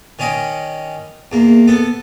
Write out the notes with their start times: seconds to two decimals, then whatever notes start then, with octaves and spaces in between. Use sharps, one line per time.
0.19 D#3 C#4 D5 D#5
1.32 E2 A#3
1.68 B3 A4